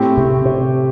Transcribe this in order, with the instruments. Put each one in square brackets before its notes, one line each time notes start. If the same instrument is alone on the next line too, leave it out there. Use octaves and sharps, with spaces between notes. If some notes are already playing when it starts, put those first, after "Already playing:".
Already playing: [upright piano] A2 A3 C4 G4
[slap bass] C3
C3